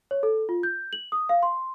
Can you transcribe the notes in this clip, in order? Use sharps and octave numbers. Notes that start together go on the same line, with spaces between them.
C#5
A4
F4
G6
F#7
D#6
F5
C6